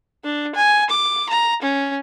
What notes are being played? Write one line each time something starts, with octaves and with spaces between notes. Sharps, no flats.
D4
G#5
D6
A#5
C#4